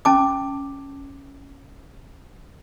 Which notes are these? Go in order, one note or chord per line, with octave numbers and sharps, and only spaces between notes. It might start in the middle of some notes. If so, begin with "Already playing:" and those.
C#4 A5 D6